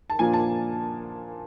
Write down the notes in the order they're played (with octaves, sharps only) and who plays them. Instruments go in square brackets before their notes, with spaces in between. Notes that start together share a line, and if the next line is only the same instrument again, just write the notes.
[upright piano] A5
[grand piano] A#2 F3 A#3 D4 F4 [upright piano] G#5
[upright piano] A5